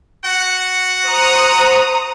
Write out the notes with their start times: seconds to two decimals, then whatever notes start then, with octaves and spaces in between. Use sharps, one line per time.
0.25 F#4 F#5
1.07 C5 A#5 D#6